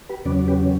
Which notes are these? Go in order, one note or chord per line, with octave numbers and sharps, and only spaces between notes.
G4 B4
E2 C#3 F#3 C#4 B4 D5
G4 B4